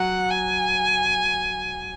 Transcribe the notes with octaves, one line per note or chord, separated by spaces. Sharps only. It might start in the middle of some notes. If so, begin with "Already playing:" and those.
Already playing: F#3 F#5
G#5